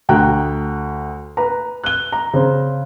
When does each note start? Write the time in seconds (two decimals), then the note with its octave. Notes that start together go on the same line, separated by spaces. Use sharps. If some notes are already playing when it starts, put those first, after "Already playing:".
0.09 D2 G5 A#5 F#6
1.37 B4 A#5
1.84 F#6 G7
2.12 A#5
2.33 C#3 C4